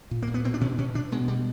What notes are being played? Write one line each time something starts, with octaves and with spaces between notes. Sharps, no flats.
A#2
A#2 A#3
B3
B2 C4
D4
B2 C#4
B2 C#4
B2 D4
B2 G#3
B2 G3